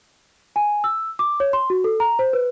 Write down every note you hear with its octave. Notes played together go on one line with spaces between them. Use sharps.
G#5
E6
D6
C#5
C6
F#4
A4
A#5
C5
B4